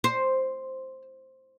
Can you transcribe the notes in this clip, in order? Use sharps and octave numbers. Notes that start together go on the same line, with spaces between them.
C5